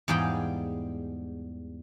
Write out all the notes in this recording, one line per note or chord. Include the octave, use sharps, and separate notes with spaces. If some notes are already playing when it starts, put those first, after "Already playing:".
E2 G#2 G3 G#4 F5 G5